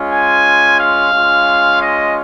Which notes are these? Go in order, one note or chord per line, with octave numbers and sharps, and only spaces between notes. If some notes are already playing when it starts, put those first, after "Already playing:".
Already playing: G#3 C#4 F4
G#5
F5
G#3 C#4 F4
D#5